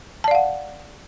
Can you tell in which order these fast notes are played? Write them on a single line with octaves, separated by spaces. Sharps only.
A5 D5 F5 F#5